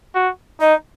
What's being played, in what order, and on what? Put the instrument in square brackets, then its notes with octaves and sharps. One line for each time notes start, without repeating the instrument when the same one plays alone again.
[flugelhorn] F#4
[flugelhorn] D#4 [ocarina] D#5